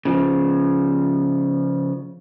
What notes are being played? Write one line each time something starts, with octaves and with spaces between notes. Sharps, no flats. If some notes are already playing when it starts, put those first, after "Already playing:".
C#3 F3